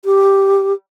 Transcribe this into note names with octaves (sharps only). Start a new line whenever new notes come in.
G4